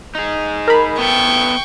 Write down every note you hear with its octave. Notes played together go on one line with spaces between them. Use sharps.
D#4 G#4
A#4 B5
B3 E4 A4 G5 C#6